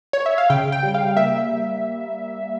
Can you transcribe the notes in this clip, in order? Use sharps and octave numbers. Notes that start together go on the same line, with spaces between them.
C#5
E5
F5
C#3 G5
G5
G3
F5
A#3 E5